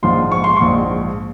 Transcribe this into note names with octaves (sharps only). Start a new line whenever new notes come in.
A#1 G#2 F3 C6
C#6
C6
A#1 G#2 F3 C#6